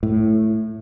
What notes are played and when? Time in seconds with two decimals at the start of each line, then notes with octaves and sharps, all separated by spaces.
0.03 A2